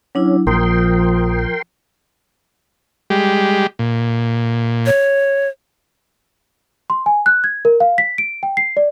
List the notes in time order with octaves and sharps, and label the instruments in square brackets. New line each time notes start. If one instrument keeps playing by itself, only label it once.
[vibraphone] F#3 D4 E4 [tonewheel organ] C#4
[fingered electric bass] A#1 [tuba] F3 [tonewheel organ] A#4 G5 C6 [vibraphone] D#6
[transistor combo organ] G3 G#3 G4
A#2
[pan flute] C#5
[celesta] C6
G#5
F#6
G#6
A#4
F5
B6
D7
G5
C7
D5